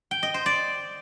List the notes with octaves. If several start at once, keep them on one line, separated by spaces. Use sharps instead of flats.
G5
D#5
C5
D5